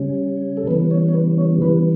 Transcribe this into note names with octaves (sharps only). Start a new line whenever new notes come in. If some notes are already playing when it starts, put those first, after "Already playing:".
Already playing: C#3 G3 C#4
A4
C#3 E3 G3 B3 B4
C#5
C#5
B4
C#5
C#3 E3 G3 B3 B4